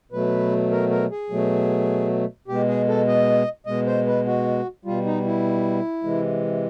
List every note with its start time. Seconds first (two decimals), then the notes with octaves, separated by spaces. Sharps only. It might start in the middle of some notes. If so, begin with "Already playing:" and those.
0.12 B2 F#3 A3 B4
0.71 A#4
0.91 A#4
1.11 G#4
1.30 B2 F#3 A3
2.48 B2 G#3 G4
2.68 G#4
2.88 A4
3.08 D#5
3.66 B2 G#3 D#5
3.86 C5
4.06 B4
4.26 F#4
4.85 B2 G3 F4
5.05 D#4
5.25 E4
6.04 C3 E3 G#3